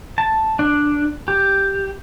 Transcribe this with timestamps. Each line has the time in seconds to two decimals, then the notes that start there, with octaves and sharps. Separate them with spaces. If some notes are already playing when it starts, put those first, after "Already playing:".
0.18 A5
0.59 D4
1.28 G4